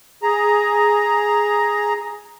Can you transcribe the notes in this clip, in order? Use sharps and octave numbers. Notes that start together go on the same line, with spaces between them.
G#4 A#5